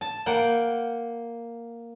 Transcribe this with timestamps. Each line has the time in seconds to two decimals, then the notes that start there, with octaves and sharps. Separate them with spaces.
0.01 A5
0.26 A#3 F#5 G5